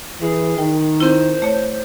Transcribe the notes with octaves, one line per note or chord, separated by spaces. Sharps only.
E3 G#4
D#3 G5
C4 E4 C5
A3 C#5